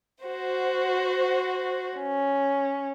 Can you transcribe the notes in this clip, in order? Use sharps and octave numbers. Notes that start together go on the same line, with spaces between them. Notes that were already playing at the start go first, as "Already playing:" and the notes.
F#4 C5
C#4